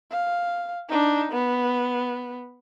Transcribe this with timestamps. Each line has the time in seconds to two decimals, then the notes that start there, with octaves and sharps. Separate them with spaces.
0.11 F5
0.89 D4 D#4
1.32 B3